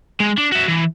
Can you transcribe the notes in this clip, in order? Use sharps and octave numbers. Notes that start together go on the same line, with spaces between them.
G#3
D4
F#4 E5
E3